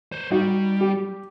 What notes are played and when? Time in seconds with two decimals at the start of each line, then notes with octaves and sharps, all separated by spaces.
0.12 C5 C#5
0.31 G3 D#4 F#4
0.81 G4